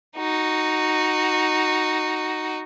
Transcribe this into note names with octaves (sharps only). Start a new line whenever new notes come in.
D#4 F#4